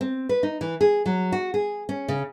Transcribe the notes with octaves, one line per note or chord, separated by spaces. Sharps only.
C4
B4
D#4
E3
G#4
F#3
F#4
G#4
C#4
C#3